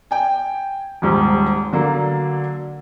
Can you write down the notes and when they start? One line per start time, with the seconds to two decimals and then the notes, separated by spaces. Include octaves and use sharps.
0.11 G5 G#5
1.02 D#1 G#2 G3
1.72 D3 F#3 A#3